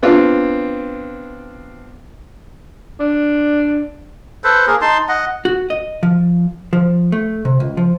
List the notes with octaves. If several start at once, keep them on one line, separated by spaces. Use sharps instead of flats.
B3 C4 D4 F4
D4
A4 B4 C5
A#3 G#4 A#4
D#4 A5 C6
D#5 F#5
F#4
D#5
F3
F3
A3
C3
C#2
F3